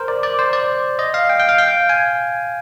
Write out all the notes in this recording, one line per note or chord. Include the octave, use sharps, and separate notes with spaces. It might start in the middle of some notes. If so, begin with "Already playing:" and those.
Already playing: A#4 C5
D5
D5
C5
D5
D#5
F5
G5
G5
F5
G5
F5
G#5